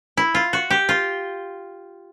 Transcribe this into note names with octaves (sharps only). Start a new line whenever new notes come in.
E4
F4
F#4
G4
F4